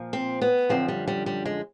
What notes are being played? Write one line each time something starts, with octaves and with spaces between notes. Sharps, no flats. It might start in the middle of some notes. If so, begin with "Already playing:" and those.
Already playing: A#2 F3
C4
B3
F#2 D3 F3 C4
G3
G3
G3
G#3